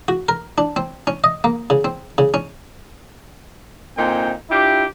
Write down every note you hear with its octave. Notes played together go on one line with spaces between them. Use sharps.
F#4
A#4
D4
C4
C#4
D#5
A#3
C#3
C4
C#3
C#4
A#2 D3 C4 D#4 G5 G#5
D4 E4 F4 G4